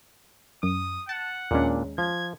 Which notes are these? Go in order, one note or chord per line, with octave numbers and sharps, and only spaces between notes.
F#2 D#6
F#5 A5
D#2 A#2 G#3 C#4 D4
F3 G#6